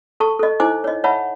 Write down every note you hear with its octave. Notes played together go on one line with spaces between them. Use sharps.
A4 A5 C#6
A4 D#5
D#4 E4 C5 G#5 D6
C#5 D#5
C#5 E5 F#5 A5 B5